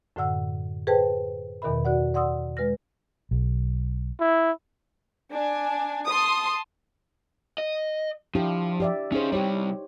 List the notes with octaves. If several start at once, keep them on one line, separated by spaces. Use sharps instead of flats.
F#2 A2 D3 F#5 E6
G#4 A4 B4 C5 G5 A5
E2 B2 D#3 A#4 E5 B5
F#4 D5 F#5
D5 F#5 C6 D#6 E6
G#3 B4 F6 A#6
B1
E4
D4 G#5
A5 C6 D#6
D#5
F3 D4 E4 G4
G4 D5 E5
C#4 D#4 G#4 C5
C2 G3 G4 C#5